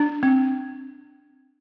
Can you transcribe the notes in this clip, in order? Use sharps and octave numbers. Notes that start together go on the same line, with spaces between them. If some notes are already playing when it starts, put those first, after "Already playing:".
Already playing: D4
C4